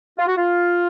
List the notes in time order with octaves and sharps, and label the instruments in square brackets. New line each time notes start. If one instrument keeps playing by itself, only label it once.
[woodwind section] F4
F#4
F4